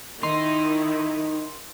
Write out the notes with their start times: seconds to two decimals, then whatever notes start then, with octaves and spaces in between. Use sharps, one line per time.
0.23 D#3 D#4 E4 C6